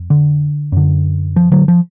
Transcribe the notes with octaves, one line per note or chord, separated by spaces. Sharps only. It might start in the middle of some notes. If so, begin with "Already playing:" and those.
Already playing: F2
D3
F#2 D3
F3
D3 F#3
F3